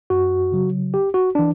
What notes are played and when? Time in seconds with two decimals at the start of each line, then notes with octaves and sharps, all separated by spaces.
0.10 F#2 F#4
0.52 C#3 F#3
0.94 G1 G4
1.14 F#4
1.35 E3 D4